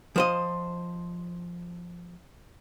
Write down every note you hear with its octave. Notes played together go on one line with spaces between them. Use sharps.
F3 C5 D#5